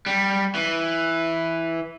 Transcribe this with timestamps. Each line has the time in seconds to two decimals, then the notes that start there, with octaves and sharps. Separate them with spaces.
0.06 G3
0.55 E3